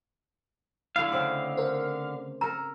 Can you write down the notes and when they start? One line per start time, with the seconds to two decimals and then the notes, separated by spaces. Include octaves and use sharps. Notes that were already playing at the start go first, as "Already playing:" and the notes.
0.96 D3 A3 E4 F5
1.12 C#3 C4 D5
1.57 A#4 C5
2.41 A4 A#4 A#5